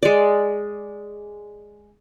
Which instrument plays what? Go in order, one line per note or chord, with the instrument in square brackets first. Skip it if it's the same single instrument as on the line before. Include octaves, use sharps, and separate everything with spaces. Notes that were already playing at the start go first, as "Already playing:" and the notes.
[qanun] G#3 D5